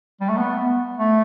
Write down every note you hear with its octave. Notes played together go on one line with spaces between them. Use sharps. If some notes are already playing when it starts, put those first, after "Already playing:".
G3
A3
B3
A3